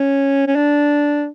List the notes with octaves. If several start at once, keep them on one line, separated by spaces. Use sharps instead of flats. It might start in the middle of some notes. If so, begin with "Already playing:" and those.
Already playing: C#4
C#4
D4